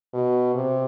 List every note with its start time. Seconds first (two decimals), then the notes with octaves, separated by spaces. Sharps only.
0.13 B2
0.55 C3